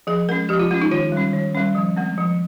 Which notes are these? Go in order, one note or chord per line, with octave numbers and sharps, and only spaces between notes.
F3 G#4
G#3 C#4 A#4
F3 G4
F4
G#3 C#4 F4
D#4
D#3 F4
G3 C#4
D#3
G3 C#4
F3
G#3 C4
F3